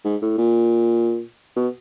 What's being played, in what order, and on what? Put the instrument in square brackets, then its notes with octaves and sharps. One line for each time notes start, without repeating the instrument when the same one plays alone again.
[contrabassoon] G#2
A2
A#2
B2